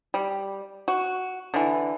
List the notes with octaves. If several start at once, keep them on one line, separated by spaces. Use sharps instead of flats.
G3
F#4
D3 E3